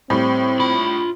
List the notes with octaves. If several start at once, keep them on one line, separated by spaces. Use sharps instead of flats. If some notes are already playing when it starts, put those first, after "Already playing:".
A2 G3 C4
F4 B5